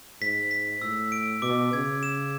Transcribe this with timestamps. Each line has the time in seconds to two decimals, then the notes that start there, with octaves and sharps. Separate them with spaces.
0.21 G#2 B6
0.51 B6
0.82 A2 E6
1.12 D7
1.42 B2 D6
1.73 C#3 G#6
2.03 E7